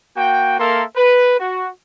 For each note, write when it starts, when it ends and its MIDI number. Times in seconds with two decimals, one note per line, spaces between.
0.17 0.58 58
0.17 0.58 66
0.17 0.58 79
0.60 0.83 58
0.60 0.83 69
0.60 0.83 70
0.60 0.83 76
0.60 0.83 84
0.96 1.39 71
1.39 1.68 66